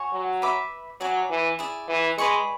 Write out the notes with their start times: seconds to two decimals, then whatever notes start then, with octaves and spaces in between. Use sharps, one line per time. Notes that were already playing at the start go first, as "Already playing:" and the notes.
Already playing: F#4 C#5 G#5 C#6
0.12 F#3
0.42 B4 E5 B5 D6
1.01 F#3 D5 G#5 D6
1.30 E3
1.59 E4 G#4 D5
1.88 E3
2.18 G#3 B4 D5 G#5 C#6